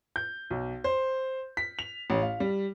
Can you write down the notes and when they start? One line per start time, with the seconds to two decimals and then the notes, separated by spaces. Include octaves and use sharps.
0.16 G6
0.50 B1
0.84 C5
1.57 B6
1.79 F7
2.10 A1
2.22 F5
2.40 G3